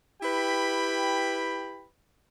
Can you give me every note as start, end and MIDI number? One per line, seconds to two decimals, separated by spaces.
0.20 1.85 64
0.20 1.85 67
0.20 1.85 71
0.20 1.85 79
0.20 1.85 83